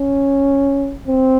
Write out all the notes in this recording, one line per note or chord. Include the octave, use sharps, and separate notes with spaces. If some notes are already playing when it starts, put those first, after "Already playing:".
Already playing: C#4
C4